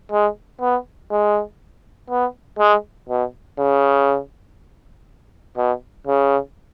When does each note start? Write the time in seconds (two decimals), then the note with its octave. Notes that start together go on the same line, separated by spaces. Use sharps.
0.12 G#3
0.61 B3
1.11 G#3
2.10 B3
2.59 G#3
3.09 B2
3.59 C#3
5.57 B2
6.07 C#3